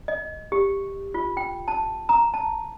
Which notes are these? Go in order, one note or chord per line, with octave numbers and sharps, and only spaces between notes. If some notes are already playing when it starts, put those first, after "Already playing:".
D#5
G4
F4
G5
A5
A#5
A5